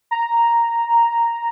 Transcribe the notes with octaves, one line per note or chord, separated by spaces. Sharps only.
A#5